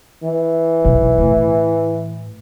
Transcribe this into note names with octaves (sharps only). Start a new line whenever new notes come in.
E3
B1
A2